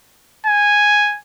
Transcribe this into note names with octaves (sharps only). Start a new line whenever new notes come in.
G#5